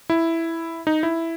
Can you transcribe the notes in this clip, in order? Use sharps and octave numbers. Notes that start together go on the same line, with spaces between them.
E4
D#4
E4